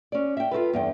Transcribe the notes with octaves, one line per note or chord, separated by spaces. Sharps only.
C#4 D5
E5 G5
F4 F#4 A4 B4
E2 G2 G5